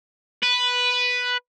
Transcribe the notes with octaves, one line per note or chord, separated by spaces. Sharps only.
B4